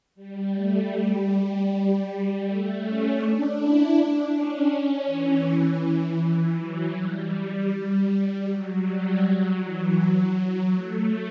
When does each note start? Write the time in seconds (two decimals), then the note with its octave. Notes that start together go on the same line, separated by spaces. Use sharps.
0.15 G3
0.53 A3
0.91 G3
2.42 A3
2.80 C#4
3.17 D4
3.55 E4
3.94 D4
4.32 C#4
5.06 E3
5.82 E3
6.20 E3
6.57 F#3
6.96 G3
7.71 G3
8.47 F#3
8.85 G3
9.22 F#3
9.61 E3
9.98 F#3
10.74 A3